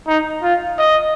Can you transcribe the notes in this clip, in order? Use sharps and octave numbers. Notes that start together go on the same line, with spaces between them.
D#4
F4
D#5